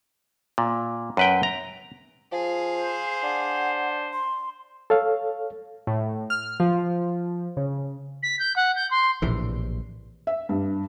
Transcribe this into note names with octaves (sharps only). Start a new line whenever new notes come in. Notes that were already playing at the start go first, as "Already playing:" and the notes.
A#2
F#2 B4 G5
A#5
F3 G#4 F5
C5
D4 F#5
C6
A4 C#5 F5
A2
F6
F3
C#3
B6
G6
F#5
G6
C6
A#1 A2 C3 E3
E5
G2